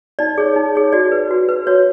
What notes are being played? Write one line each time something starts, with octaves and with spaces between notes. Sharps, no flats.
D#4 D5
G#4 C#5
D#4
G#4 C#5
F#4 D5
B4
F#4
B4
F#4 C#5